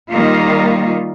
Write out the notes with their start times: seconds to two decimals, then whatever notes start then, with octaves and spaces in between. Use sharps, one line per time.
0.11 D#3 G3 A#3 F4